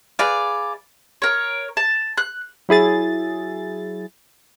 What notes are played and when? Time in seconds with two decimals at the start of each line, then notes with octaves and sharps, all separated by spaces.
0.19 G#4 B4 D5 F5
1.22 A#4 C#5
1.77 A5
2.18 F#6
2.69 F#3 E4 G#4 A6